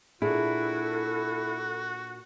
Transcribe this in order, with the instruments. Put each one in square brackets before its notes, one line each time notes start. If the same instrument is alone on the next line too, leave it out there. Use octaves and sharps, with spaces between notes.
[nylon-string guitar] A#2 D4 G#4 [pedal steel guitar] E4 [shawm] F#4 [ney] A4